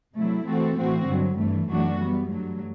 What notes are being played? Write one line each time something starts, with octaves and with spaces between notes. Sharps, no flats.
C3 F#3 A3 E4
E3 A3 C4 F#4 A4
A2 E3 A3 C4 F#4
G2 D3 F#3
G2 E3 A3
F#2 E3 A3 D4 F#4
E3 G3 B3
G2 F#3 A3